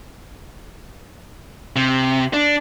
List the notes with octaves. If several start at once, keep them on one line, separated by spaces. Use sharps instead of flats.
C3
D4